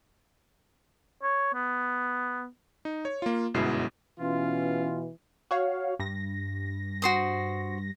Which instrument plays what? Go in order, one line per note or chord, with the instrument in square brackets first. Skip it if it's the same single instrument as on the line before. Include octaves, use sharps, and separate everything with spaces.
[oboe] C#5
B3
[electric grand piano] D#4
C#5
A#3 F4
G1 F#2 B2 G#3 E4 C7
[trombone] B2 [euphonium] E3 [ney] C#4 [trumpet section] F4
[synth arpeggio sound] F#4 C#5 F5
G2 A#6
[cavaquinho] F#4 C5 D#6